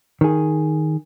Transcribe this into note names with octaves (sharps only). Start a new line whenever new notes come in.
D#3 G#4